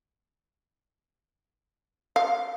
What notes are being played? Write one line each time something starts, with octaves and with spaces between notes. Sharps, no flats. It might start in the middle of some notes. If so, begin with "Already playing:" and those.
F5